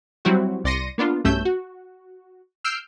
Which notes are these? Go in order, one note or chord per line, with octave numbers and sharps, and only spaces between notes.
F#3 G3 C4 E4 F#4
C2 D5 C6 A#6 C#7 D#7
A#3 B3 D4 F4
B1 G2 A3 C#4 E6 G6
F#4
E6 F6 G6 C7 D7